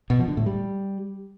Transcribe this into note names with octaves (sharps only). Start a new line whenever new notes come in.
B2
F3
D3
A2
G3